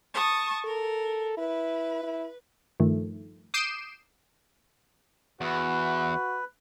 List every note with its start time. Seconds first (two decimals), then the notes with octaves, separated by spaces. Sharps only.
0.13 A5 C#6 D#6
0.65 A4 A#4
1.38 E4 B4
2.03 E4
2.80 G2 D#3 F3 A3
3.54 D6 D#6 G6 C7 D7 E7
5.41 E2 F#4 B4